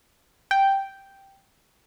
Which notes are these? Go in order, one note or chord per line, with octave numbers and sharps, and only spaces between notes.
G5